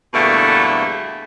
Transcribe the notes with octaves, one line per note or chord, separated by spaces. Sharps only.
E2 G2 B2 D3 A3 A#3